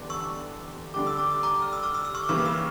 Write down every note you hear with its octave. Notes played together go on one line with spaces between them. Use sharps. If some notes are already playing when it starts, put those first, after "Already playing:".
Already playing: E2 D3 G3 D4
C#6 E6
D3 G3 D4 G4 D6
E6
D6
E6
A#5 D6
F6
E6
D6 F6
E6
F6
C#6 E6
D6
C#3 E3 G3 A#3 C#6 E6
D6
C#6 E6